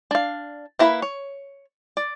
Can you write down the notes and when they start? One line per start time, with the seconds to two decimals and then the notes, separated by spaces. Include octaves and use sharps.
0.11 D4 F5
0.79 A#3 E4 B4 A#5 B5
1.02 C#5
1.97 D5